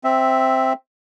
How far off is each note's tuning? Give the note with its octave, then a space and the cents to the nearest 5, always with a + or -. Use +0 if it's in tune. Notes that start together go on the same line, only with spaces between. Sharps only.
C4 +0 E5 +0